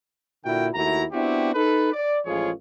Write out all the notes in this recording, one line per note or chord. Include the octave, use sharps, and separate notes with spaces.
A#2 D3 E4 F#4 A#4 G5
D#2 A3 E4 F#4 A#5
B3 C4 D4 E4 F#4 G4
D#4 A4 B4
D5
A1 F3 G#3 F4 G#4 C#5